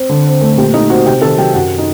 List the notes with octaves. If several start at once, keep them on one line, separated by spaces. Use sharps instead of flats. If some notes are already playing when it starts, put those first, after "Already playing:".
Already playing: C4
D3
C4
A3
A#2 G4
A3 D#4 D#5
C4 F#4 F#5
C3 G4 G5
D#3 A4 A5
F#3 G4 G5
F#2 F#4 F#5
D#4 D#5